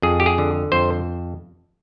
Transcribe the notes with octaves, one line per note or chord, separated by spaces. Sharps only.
F2 G#4
G4
G#4
D3
F2 C5